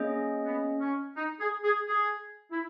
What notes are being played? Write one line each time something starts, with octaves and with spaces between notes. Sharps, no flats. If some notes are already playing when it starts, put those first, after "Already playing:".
Already playing: A#3 C#4 G#4 D#5
B3
C#4
D#4
G#4
G#4
G#4
E4